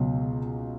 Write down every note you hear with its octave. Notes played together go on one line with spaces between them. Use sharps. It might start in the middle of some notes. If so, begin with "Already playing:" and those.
Already playing: C#2 B2 F#3